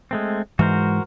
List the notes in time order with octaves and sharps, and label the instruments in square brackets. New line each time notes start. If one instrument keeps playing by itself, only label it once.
[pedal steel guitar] G#3 A3 C4
[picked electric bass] G#2 E3 G#3 [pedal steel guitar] F#4 A#4 C5